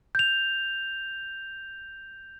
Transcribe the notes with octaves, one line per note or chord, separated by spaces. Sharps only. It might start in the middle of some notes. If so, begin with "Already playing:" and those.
G6 F7